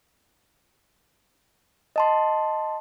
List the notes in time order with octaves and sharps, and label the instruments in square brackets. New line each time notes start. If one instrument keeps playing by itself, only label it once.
[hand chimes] D#5 A5 C6